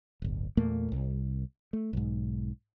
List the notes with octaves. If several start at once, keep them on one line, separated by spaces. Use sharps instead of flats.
D1 G1
E2 A#2 A3 A#3
C2
A3
B1 G#2